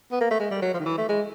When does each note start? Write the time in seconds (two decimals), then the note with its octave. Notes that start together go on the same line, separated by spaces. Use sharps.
0.12 B3
0.21 A#3
0.31 A3
0.40 G#3
0.51 G3
0.62 F#3
0.74 F3
0.80 D#3
0.86 E3
0.98 A3
1.09 G#3